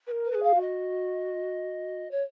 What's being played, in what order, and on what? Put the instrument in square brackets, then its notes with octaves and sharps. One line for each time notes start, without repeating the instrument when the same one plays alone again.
[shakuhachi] B4
A#4
[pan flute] B4
[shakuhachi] A#4
G#4
[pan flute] F5
[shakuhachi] F#4
[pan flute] D#5
C#5